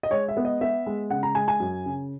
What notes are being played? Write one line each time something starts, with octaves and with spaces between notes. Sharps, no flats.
D#5
G#3 C#5
E5
B3
D#5
B3 E5
G#3
C#3 F#5
A#5
G#3 G#5
G#5
F#2
C#3